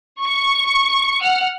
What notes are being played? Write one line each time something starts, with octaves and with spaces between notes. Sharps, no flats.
C#6
F#5 F6